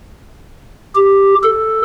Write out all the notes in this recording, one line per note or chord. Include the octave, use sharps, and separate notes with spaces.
G4
A4